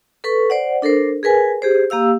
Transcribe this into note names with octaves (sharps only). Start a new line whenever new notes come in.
A4 B4 C#6
C5 D5 F#5
D4 A4 A#4 C5
G#4 A#4 B4 G#5
G4 G#4 C5
A#3 G4 F5 E6